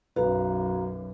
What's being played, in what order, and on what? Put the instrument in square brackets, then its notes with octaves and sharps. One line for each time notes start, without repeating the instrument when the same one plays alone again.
[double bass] B1 F#2 [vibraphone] F#4 F5 A#5 [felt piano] B4